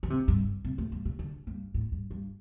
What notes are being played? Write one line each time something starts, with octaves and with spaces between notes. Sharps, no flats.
D3
C3
G2
C3
A2
G2
C3
D3
G2
A2
G2
G2